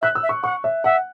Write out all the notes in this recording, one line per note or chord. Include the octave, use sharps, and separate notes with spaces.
E5 F#6
E6
E5
C#6
F#5 C#6
E5
E5 F#5